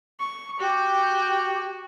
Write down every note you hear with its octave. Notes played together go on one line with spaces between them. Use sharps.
C#6
F#4 G4